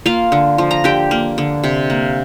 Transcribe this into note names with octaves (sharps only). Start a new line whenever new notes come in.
A#3 F4 F5
D3
F3
A#5
D3 G4 G5
A#3
D3
C3
A#3